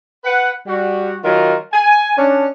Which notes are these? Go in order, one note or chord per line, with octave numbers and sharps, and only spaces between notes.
B4 F#5
G3 F#4
D#3 F#3 F4 A#4
G#5
C#4 D4